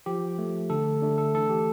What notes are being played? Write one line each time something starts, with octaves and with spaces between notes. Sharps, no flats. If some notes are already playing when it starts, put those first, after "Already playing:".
F3 G4
A3
D3 A4
A3 D4
A4
E3 A4
G4